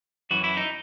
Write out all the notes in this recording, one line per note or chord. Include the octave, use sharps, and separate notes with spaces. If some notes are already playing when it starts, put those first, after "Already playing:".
F#2 E3 F#4
E4
D#4